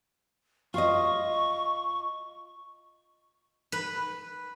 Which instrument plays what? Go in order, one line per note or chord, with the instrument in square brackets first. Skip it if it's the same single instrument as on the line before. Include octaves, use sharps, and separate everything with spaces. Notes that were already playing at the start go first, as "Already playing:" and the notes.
[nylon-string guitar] F4 D#5 [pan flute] C#6
[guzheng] B4